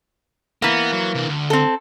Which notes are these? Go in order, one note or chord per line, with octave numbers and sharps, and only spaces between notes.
E3 A#3 B3
F#3
C3 D4
D2
C4 A4